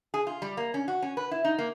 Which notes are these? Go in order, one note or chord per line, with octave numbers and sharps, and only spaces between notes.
G#4
F4
G3
A#3
C#4
F#4
C#4
B4
E4
D#4
A#3